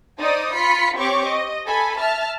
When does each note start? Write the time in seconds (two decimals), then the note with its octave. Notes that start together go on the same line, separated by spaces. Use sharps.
0.19 D#4 C5 D5 D#6
0.54 F4 B5 B6 C#7
0.96 C4 G4 C#5 C#6 D6
1.27 D#5
1.67 A4 G#5 B5
1.99 E5 A5 F6